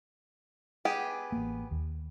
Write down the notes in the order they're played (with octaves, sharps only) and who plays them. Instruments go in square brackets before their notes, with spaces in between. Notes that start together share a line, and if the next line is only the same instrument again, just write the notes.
[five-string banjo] B3 G4 G#4
[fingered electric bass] A1 A#3
D#2